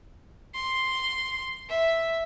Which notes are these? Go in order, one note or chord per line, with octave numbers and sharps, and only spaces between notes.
C6
E5